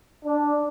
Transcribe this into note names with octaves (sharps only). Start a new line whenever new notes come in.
D4